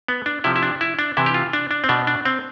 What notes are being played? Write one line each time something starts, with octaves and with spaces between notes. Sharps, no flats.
B3
D4
C3 F3 E4
E4
D4
E4
D4
C3 E3 E4
G4
F4
D4
D4
C4
B2 D4
D4
C4